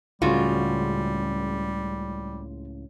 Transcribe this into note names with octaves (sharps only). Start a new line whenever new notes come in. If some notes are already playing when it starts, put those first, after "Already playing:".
C#2 A2 C#3 G3 G#3 F4 F#4